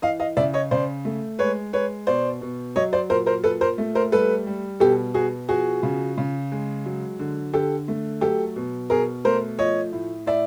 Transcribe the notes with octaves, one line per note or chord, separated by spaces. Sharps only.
E3 D#5 F5
D#5 F5
C#3 D5 E5
C#5 D#5
C#3 C5 D5
A3
G#3 B4 C#5
G#3 B4 C#5
B2 C5 D5
B2
F#3 C#5 D#5
C5 D5
A#2 A#4 C5
A#4 C5
A#2 A4 B4
A#4 C5
A3
A#4 C5
G3 A4 B4
G3
B2 G4 A4
B2 F#4 G#4
F3 F#4 G#4
C#3
C#3
G#3
F#3
D3
D3 G4 A4
A3
F#3 G4 A4
B2
B2 G#4 A#4
A3 A#4 C5
F3 C#5 D#5
A2
A2 D5 E5